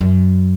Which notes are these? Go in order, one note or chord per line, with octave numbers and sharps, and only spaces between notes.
F#2